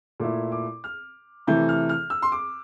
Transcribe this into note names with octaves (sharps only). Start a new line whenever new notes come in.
A#2 A3 E4 D6
D6
F6
C3 E3 A3 G6
F6
F6
E6
C6
D6